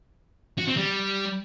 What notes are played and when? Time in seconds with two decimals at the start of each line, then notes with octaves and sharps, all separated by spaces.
0.58 F#4
0.67 C4
0.77 G3